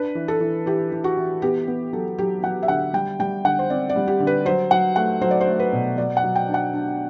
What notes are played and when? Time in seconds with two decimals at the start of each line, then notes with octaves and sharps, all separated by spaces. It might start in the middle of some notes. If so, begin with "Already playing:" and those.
Already playing: D4 B4
0.15 E3
0.28 A4
0.41 E3
0.66 E3 G4
0.92 E3
1.04 F#4
1.17 E3
1.42 B3 G4
1.67 B3
1.93 F#3 A4
2.18 F#3 G4
2.43 F#3 F#5
2.63 E5
2.68 D3 F#5
2.93 G3 G5
3.19 G3 G5
3.44 D3 F#5
3.59 C5
3.70 C4 D5
3.90 D5
3.96 G3
4.08 G4
4.20 D3
4.27 B4
4.45 F#3 C5
4.71 F#3 F#5
4.96 A3 F#5
5.21 F#3 C5
5.31 D5
5.41 C5
5.48 A3
5.60 B4
5.73 B2
5.97 F#3 D5
6.17 F#5
6.24 F#3
6.35 G5
6.48 D4
6.54 F#5
6.73 D4